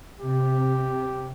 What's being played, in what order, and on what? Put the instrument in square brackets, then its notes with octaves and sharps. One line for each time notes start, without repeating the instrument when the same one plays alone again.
[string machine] C3 [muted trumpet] G4